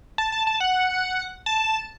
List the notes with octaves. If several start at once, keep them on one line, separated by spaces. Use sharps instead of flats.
A5
A5
A5
F#5
A5